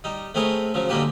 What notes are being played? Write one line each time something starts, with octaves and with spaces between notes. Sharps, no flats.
G3 D#4
A3 C4 G#4 A#4 B4 C#5
C#3 F3 F#3
D3 G3 G#3 A#3 G4 B4